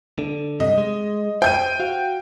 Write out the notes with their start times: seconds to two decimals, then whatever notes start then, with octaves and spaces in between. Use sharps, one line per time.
0.19 D3
0.60 G2 C3 D#5
0.78 G#3
1.42 C5 G5 G6 D#7
1.80 F#4 F5